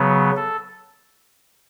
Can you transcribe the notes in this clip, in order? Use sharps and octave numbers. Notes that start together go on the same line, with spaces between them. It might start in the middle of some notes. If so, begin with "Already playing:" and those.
Already playing: C#3 F#3 B3
A4